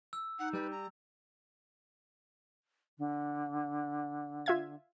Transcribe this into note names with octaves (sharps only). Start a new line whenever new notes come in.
E6
D#4 F#5
G3 B4
A#5
D3
F4 E5 G#6